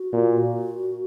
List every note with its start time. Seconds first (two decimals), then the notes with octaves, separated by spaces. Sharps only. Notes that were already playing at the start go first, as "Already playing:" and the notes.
Already playing: F#4
0.13 A#2